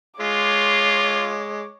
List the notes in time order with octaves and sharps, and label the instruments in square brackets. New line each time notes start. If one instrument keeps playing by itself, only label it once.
[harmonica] G#3 [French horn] F4 [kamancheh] C#5 D6